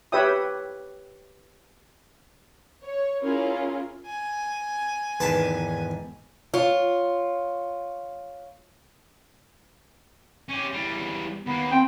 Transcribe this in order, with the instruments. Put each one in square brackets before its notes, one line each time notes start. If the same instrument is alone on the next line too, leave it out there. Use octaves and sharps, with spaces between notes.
[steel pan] G4 B4 C#5 E5 G5 D#6
[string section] C#5
C#4 E4 F4 G#4 A#4
[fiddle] G#5
[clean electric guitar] E2 G#2 D#3 [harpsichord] B4 A5
[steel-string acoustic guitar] F4 C#5
[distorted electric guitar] C#4 G4
E2 G3
[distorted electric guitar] D#2 A#3 [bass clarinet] B3
[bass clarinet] C4 [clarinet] G5